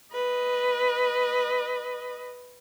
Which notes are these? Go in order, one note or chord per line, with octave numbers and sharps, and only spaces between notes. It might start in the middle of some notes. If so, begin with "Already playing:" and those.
B4 D#5